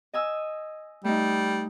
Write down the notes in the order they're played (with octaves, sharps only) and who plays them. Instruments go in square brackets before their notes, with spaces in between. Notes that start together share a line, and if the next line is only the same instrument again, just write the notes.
[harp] D#5 G#5 E6
[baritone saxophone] G3 [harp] A3 D#4